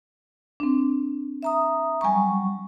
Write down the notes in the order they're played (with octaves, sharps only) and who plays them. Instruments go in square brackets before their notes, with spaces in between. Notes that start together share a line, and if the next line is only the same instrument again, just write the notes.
[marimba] C4 D4
[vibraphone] E5 A#5 D#6
[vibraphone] F#3 G3 C#6 [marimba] G#5 A#5